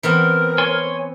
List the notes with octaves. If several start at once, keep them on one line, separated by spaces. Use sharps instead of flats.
E3 B3 C4 A#4
C#5 G#5 C6